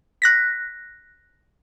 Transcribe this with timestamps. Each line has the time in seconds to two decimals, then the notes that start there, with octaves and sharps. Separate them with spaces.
0.22 F#6 A#6 B6